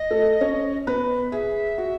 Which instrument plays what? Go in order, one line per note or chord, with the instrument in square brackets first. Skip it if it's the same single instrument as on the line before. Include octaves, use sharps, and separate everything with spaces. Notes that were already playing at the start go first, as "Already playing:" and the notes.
Already playing: [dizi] D#5
[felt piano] A3 A4
C#4 C#5
B3 B4
[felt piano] G#4 [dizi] E5
[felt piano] F#4